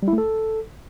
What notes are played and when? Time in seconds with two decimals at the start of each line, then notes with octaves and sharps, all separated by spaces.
0.03 G3
0.08 E4
0.13 A3
0.18 A4